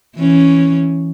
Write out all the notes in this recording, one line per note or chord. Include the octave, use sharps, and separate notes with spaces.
E3 C#4